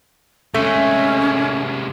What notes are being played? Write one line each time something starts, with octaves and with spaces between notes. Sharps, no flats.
C3 G#3 A3 C#4